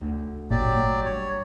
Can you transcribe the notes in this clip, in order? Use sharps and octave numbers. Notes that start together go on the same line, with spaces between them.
D2 C#3
G#1 A#2 F#3 G4 D5
G1 A#3
G2 C#5